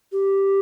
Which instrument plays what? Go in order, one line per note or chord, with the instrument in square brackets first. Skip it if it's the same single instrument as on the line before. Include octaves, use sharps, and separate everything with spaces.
[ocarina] G4